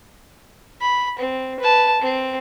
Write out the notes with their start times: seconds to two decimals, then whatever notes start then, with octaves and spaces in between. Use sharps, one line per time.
0.82 B5
1.19 C4
1.60 B4 A5
2.02 C4